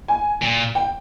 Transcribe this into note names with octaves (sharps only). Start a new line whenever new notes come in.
G#5
A#2
G5